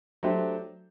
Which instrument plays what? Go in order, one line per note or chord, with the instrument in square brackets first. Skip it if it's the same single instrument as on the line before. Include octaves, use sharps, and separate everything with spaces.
[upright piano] F#3 A3 D4 G4 C5